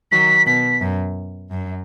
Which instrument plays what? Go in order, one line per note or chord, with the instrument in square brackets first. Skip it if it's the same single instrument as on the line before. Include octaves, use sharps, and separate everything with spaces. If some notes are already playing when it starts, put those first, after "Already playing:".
[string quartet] D#3 F#3 [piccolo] B6
[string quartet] B2 [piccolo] B6
[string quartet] F#2
F#2